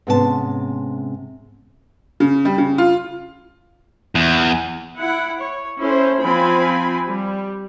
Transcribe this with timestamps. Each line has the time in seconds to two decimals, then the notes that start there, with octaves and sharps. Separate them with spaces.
0.07 G#2 C3 B3 C#4 F#4 A5
2.20 C#3
2.45 G3
2.58 C#3
2.78 F4
4.15 E2
4.98 E4 F#5
5.39 C#5
5.80 C#4 E4 A4 C5
6.23 F3 C4 G#5 B5
7.07 G3